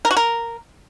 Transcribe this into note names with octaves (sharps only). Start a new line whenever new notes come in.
A#4
F#4
A#4